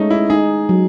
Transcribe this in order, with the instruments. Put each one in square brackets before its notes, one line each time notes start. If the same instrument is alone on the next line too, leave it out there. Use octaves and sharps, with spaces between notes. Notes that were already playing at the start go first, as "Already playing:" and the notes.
Already playing: [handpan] G#3 [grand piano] A3 C#4 D#4
[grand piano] E4
[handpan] D#4 [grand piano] G#4
[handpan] F#3